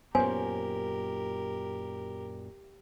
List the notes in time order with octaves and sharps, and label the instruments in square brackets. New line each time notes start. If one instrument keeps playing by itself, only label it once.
[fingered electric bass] F#2 A#2 [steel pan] B3 C#4 C5 [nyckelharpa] G4 A#4 [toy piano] G#5